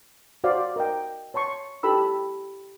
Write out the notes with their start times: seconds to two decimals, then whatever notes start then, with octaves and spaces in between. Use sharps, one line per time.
0.44 F#4 C5 D5 F5
0.76 A#4 D#5 G5
1.34 C#5 A5 C6 C#6
1.83 E4 G4 A4 B5 E6